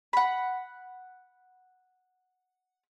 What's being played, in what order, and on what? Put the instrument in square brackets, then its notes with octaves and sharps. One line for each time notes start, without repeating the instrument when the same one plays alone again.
[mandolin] F#5 B5